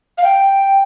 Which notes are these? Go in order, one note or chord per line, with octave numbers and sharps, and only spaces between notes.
F5
G5